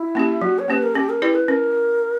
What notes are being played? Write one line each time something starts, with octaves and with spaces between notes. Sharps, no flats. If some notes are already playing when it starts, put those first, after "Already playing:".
Already playing: E4
A#3 C#4 G4
F#3 F#4
C#5
A#3 C#4 G4 B4
A#4
C#4 G4
A#4
E4 G4 B4 D5
B4
C#4 A#4